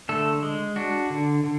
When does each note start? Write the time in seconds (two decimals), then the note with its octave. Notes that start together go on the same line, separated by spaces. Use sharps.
0.09 D3 A3 A4
0.43 G#3
0.76 D4 F#4
1.10 D3
1.44 D3